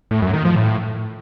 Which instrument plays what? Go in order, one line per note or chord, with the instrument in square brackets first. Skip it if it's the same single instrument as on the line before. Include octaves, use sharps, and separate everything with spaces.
[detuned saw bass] A2
F#2
D#3
F3
A2